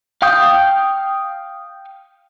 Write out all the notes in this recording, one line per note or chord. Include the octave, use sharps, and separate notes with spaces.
F5 G5 C#6 D#6 G6